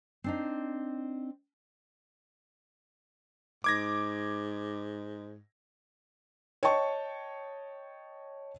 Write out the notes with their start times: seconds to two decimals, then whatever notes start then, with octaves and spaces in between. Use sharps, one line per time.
0.24 C4 D4 D#4
3.64 G#2 D6 G#6 A#6
6.63 C#5 D#5 G5 A5 C#6